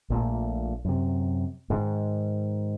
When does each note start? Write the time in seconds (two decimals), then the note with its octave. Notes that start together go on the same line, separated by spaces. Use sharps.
0.10 A#1 A#2 A3
0.85 F#2 C3
1.70 G#2 D#3